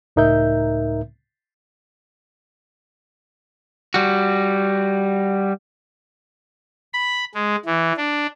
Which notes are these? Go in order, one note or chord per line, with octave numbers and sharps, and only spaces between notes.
C#2 A2 D#4 A#4 E5 G6
G3 F#4
B5
G#3
E3
D4